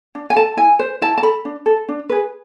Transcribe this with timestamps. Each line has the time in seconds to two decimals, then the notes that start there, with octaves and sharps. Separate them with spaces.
0.15 D4
0.30 G#5
0.36 A4 A5
0.57 E4 G#5
0.79 B4 C5
1.02 E4 A5
1.18 A5
1.22 A4 B5
1.45 D4
1.66 A4
1.89 D4
2.09 G#4 B4